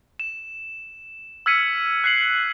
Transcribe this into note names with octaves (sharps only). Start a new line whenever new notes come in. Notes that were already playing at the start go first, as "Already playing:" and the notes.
E7
E6 F6 G#6 B6 C#7 D#7
F#6 C7 F#7